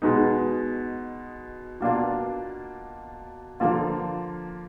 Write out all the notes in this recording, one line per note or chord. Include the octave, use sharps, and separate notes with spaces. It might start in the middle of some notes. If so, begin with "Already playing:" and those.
B2 G#3 B3 D#4
B2 A#3 D4 F4
D3 F3 A#3 F4